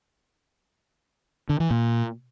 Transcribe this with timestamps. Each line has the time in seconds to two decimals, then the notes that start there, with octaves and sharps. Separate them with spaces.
1.49 D3
1.60 E3
1.70 A#2